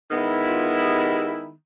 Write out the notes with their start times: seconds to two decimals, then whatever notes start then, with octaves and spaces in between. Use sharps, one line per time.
0.10 D#3 G#3 B3 E4
0.46 F4
0.81 G4